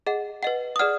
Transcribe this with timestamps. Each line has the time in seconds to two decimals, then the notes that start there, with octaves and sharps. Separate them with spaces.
0.06 G#4 D#5 F#5
0.43 B4 D#5 F#5
0.76 D#6
0.79 G#4 D5 F#5 F6